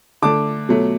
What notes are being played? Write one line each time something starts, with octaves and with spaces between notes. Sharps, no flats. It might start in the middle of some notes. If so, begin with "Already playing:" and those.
D3 A3 A5 D6
B2 F#3 A3